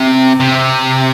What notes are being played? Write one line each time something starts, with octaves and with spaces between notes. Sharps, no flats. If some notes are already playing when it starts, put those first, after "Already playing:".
Already playing: C3
C3